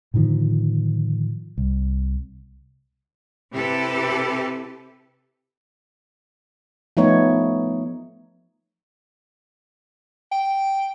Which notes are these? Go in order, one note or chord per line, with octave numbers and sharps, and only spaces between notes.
A2 D3 D#3 F3
C2
C3 E4 G4 A4 B4
F3 A3 B3 D#4 C#5
G5